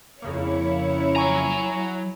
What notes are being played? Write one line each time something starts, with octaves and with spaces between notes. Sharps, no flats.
F2 C#3 A#3 E4 C#5
F#3 G#5 A#5 C#6